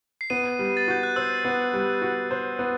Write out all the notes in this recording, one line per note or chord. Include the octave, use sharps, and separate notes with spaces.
C7
B3 D#7
G3
A6
F#4 G6
F#6
C5 E6
B3
G3
F#4
C5
B3